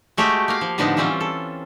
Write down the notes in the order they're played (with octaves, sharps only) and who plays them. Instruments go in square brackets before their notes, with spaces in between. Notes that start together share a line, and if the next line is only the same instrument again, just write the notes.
[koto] G#3 A3 F#4 G4
A#3 F5
F3
A2 D3 F3 B3 D#4 A5
E3 G3 C4 C#4 F4
A4